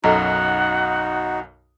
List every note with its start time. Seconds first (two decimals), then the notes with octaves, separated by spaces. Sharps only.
0.04 B1 F#2 D#4 F#4 A4 D#5 F#5 A#5